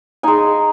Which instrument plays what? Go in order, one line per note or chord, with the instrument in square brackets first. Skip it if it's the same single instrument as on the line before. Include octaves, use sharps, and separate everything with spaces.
[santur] G#3 D#4 G#5